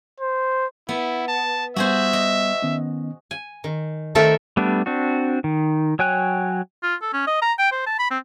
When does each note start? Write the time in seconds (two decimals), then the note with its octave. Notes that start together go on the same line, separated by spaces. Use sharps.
0.20 C5
0.89 B3 E4
1.28 A5
1.76 G3 B3 F#4 G#4 C5 E5
2.13 D#5
2.62 D#3 B3 C#4
3.31 G#5
3.64 D#3
4.15 D#3 A3 C4 A4 A#4 E5
4.57 G3 A3 B3 D4
4.86 C4 D4 F#4
5.44 D#3
5.99 F#3 C#5 G5 G#5 F#6
6.83 F4
7.02 A4
7.13 C#4
7.27 D#5
7.42 A#5
7.58 G5
7.72 C5
7.86 A5
7.99 B5
8.11 C4